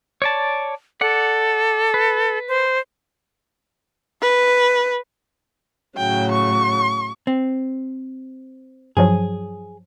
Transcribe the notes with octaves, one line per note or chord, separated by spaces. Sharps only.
C#5 D5 A5
A4 D5 F#5
B4
C5
B4
A2 C#3 F#3 G5
C#6
C4
G2 F3 F#3 G#4